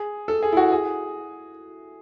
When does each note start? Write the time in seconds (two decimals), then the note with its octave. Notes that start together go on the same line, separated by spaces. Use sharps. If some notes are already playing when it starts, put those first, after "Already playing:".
Already playing: G#4
0.28 A4
0.43 G#4
0.53 E4
0.57 F#4
0.72 G#4